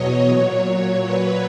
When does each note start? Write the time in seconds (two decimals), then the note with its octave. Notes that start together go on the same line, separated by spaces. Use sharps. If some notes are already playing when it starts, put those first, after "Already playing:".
Already playing: E2 B2 F#3 C#5 D#5
0.28 A#2 F#3
1.02 B4